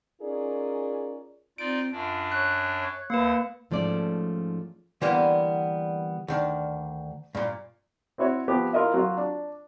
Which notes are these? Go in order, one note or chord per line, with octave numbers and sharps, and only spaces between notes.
C#4 D#4 F4 G#4 A#4 D5
C4 D#4 F4 D5 D7
F#2 D4 F4
C#5 F#6
D2 A#3 B4 F#5
G#2 F3 A3 C#4 D5
D3 E3 G3 A#3 B3
D2 D#3 D4
G2 A#2
C4 E4 F#4 C#5
F3 B3 G4
E4 F4 A#4 D#5 E5
F#3 F4
D4